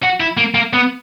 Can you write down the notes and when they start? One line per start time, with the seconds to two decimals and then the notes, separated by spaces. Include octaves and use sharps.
0.03 F#4
0.20 E4
0.37 A#3
0.55 A#3
0.73 B3